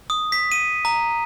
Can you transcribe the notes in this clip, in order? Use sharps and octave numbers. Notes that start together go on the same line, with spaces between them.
D#6
B6
D#7
A#5